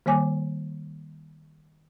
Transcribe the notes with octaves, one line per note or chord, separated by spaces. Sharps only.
D#3 G3 A#3 C#5 G#5 D6